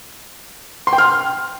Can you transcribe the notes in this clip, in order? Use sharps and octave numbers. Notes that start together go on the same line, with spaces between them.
C6
G5
F6